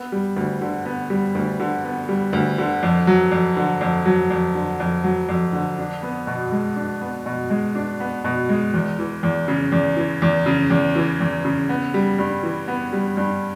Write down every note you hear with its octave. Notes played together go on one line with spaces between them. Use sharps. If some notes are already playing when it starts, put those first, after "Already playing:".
Already playing: B3
G3
D2
D3
B3
G3
D2
D3
B3
G3
D2
D3
F2
F#3
F2
D3
F2
F#3
F2
D3
F2
F#3
F2
D3
D4
B3
B2
G#3
D4
B3
B2
G#3
D4
B3
B2
G#3
E2
E3
E2
C#3
E2
E3
E2
C#3
E2
E3
E2
C#3
B3
G3
G2
E3
B3
G3
G2